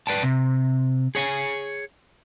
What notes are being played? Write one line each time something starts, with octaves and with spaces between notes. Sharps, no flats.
B4 D5 G5 A5
C3
G#4 C#5 G#5